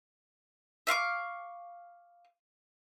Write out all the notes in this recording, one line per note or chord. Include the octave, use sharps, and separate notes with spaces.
E5 F5 C#6 D6